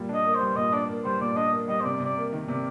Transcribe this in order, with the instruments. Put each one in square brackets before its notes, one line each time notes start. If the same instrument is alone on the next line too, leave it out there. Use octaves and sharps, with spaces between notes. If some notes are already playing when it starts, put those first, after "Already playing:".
Already playing: [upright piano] A#2 G3
[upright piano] D4 [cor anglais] D#5
[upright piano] A#3
[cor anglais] C5
[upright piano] G3
[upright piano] A#2 [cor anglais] D#5
[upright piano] D4 [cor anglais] D5
[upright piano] A#3
[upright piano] G3 [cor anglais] C5
[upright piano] A#2 [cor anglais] D5
[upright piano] D4 [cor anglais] D#5
[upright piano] A#3
[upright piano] G3 [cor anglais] D#5
[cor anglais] C5
[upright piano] C3 [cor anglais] D5
[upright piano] C3
[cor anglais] D5
[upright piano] A#3
D#3
[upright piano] C3 [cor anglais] D5